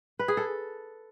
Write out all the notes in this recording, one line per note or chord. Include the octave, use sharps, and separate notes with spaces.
B4
G#4
A4